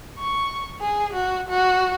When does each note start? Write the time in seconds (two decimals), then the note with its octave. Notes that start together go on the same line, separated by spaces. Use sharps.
0.19 C#6
0.81 G#4
1.13 F#4
1.49 F#4